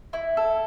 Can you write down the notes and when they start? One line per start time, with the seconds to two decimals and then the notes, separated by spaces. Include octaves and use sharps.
0.13 E4
0.37 A4